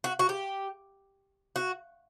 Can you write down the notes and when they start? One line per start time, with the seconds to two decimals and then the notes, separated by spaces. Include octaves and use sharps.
0.04 F#4
0.19 F#4
0.29 G4
1.56 F#4